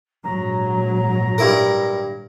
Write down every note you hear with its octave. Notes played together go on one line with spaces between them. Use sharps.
A#1 G#2 F#3 A#5
G2 E4 A#4